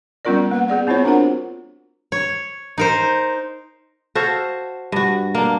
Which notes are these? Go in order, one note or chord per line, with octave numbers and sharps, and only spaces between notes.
G3 B3 C#4 F4 A#4 D5
A#3 B4 F#5
B3 G#4 D5 F#5
B3 C4 E4 F4 C5 C#5
D4 F4 F#4 A#4 F#5
C#5
D#4 A#4 C5
F#4 A4 C5 F5
G2 F#4
A#3 D4